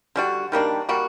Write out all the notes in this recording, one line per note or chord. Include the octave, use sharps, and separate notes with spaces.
D3 G3 D4 F#4
D#3 G3 A#3 D4
G3 A#3 F#4